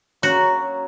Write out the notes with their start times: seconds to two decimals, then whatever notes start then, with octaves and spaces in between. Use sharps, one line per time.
0.22 F#3 A#3 C#4 F#4